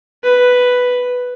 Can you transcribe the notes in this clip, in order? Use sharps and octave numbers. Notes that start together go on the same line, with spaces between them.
B4